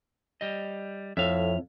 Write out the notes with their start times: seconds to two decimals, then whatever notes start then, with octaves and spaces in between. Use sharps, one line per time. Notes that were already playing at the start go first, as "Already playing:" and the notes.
0.41 G3 D#5
1.17 F2 A2 E5 F5